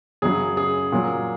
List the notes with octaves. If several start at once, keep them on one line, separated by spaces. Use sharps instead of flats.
F#2 C#3 F#3 G#4
G#4
A#2 F#3